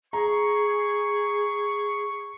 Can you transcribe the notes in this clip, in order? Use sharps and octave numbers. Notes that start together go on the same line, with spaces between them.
G#4 A#5 C#6